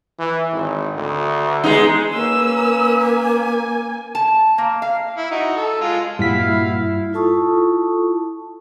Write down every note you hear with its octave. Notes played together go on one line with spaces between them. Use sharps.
E3
G#1
D2
G#3 B3 D#4
A#3 C#4 B4 E6
G#5
A5
A#3
F5
E4
D#4 F#4
A4
G#3 F4
G2 A#2 G3 E4 F#4 F5 B6
E4 F4 A4 A5 C#6 D#6